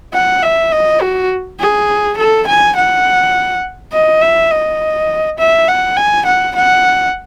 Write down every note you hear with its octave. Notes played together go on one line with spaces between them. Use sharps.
F#5
E5
D#5
F#4
G#4
A4
G#5
F#5
D#5
E5
D#5
E5
F#5
G#5
F#5
F#5